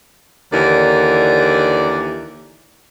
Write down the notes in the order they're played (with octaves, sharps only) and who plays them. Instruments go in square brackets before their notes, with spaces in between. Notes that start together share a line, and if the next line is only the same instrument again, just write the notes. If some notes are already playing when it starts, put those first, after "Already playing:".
[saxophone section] D#2 D3 E3 A#4 D5